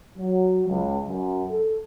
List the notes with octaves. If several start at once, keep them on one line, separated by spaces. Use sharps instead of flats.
F#3
C#2
F#2
A4